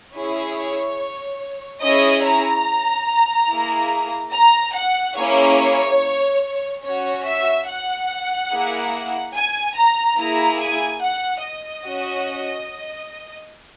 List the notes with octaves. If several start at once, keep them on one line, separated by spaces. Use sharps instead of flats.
C#4 E4 G#4 C#5
C#4 E4 G#4 D#5
A#5
A#3 E4 G#4
A#5
F#5
A#3 C#4 E4 G#4 C#5
C#4 F#4 C#5
E5
F#5
A#3 E4 G#4
G#5
A#5
A#3 E4 G#4 A#5
G#5
F#5
D#5
C#4 F#4